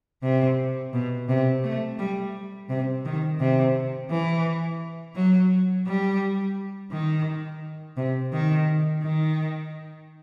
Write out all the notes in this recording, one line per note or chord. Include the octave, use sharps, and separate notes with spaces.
C3
B2
C3
A3
G3
C3
D#3
C3
E3
F#3
G3
D#3
C3
D#3
D#3